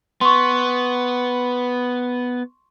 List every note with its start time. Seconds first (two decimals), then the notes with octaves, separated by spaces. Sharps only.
0.21 B3 C6 C#6